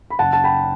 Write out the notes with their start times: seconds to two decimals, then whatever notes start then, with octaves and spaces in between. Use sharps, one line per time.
0.10 B5
0.19 F#1 F#5 A5
0.33 A5
0.44 G5 B5